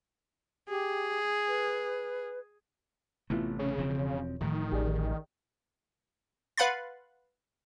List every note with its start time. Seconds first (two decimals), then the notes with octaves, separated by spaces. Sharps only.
0.69 G4 G#4
1.48 B4
3.30 A1 C3 A3 B3 E4 F4
3.59 C#3 C#5
3.78 E1 F3 C4
4.41 D1 A2 D#3 F3
4.72 A1 G4 G#4 D5
6.57 B4 F5 F#5 B5 C6 A6